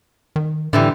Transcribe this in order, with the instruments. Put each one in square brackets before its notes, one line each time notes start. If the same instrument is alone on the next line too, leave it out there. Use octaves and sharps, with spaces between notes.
[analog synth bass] D#3
[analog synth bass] A2 [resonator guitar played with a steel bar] D3 E3 G3